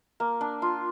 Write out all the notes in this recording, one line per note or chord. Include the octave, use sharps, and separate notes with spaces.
A#3
D4
F4